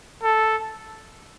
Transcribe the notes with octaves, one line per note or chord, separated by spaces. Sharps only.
A4